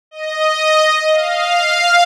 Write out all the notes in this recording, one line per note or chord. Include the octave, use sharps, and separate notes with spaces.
D#5
F5